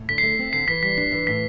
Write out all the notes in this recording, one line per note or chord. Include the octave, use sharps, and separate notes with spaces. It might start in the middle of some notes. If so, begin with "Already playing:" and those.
Already playing: A2
D3 B6
A3 C7
C4
D3 C7
E3 B6
G3 B6
D4 B6
E3
A2 B6